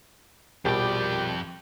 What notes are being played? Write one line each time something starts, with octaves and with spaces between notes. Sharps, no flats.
A#1 F2 B2 G3 G4 G5